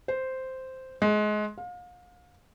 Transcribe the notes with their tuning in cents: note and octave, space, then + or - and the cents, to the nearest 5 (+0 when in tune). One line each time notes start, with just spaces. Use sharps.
C5 -5
G#3 +25
F5 +35